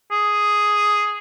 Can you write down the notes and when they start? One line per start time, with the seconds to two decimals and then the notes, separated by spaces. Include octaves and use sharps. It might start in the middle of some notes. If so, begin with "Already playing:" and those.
0.11 G#4